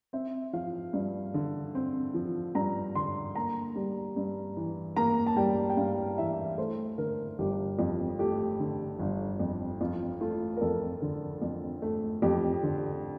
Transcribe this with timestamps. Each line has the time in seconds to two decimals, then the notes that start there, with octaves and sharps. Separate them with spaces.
0.13 C4 E5
0.53 F3 F5
0.93 G2
1.34 D3
1.75 C4
2.14 F3
2.55 G2 A#5
2.95 D3 C6
3.35 A#3 A#5
3.76 G3
4.16 G2
4.57 E3
4.96 A#3 A#5
5.26 A5
5.36 G3 G5
5.70 G5
5.77 G2 F5
6.18 E3 E5
6.58 A3 C5
6.98 D3 A#4
7.39 G1 G4
7.78 F2 F4
8.19 A3 G4
8.60 D3
8.99 G1
9.40 F2
9.80 F2 F4
10.21 A3 F4
10.57 A#4
10.61 F2 A4
11.02 D3
11.42 F2
11.82 A3
12.22 F2 G4
12.63 D3